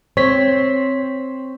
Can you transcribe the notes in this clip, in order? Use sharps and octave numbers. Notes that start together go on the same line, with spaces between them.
C4 C#5 B6